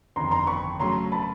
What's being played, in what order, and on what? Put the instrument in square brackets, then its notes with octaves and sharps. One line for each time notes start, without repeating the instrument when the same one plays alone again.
[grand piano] G1 F2 C3 D#3 [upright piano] A#5 C6
[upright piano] A#5 C6
B5 C#6
[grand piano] C#3 F#3 A3 [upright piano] A#5 C6
[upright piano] A5 B5